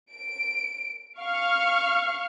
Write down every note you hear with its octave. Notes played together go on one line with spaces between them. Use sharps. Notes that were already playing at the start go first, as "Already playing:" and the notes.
D7
F5 C#6 F6